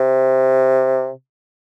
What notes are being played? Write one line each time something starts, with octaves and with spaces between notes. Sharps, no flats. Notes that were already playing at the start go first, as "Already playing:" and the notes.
Already playing: C3